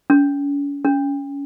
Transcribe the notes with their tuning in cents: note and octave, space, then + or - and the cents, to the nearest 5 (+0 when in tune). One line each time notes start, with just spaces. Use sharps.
C#4 +40
C#4 +25